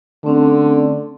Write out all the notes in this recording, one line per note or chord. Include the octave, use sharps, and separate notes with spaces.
D3 A3 C4 C#4